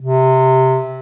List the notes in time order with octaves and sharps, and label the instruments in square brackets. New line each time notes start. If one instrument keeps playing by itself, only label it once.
[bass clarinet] C3